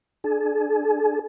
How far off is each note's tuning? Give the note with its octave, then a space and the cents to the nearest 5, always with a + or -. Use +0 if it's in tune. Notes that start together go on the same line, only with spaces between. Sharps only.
D4 +20 G#4 +45